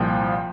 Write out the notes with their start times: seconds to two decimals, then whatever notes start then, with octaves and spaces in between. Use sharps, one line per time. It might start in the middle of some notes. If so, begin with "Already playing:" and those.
Already playing: C2 A#2 F3 G5